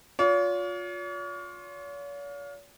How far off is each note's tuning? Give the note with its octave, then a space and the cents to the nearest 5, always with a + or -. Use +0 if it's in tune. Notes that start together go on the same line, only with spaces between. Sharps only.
F4 +25 C#5 +45